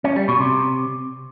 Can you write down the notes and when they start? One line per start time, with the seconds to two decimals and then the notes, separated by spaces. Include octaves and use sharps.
0.04 C#4
0.16 G3
0.28 B2
0.40 C3